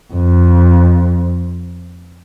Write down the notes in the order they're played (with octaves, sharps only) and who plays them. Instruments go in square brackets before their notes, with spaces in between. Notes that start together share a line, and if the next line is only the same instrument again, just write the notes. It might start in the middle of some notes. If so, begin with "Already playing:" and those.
[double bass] F2